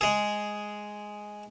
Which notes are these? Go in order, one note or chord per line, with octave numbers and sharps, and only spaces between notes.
G#3 G#4